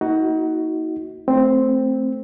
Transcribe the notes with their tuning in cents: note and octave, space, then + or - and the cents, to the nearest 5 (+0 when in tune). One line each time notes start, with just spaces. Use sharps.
A#3 +0 D#4 +35 F#4 +10
A3 +0 C4 +0